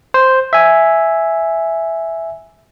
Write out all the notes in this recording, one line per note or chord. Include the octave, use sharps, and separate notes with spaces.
C5
E5 G#5